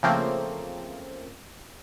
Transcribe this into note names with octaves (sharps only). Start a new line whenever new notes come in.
C#3 F3 A3 A#3 C4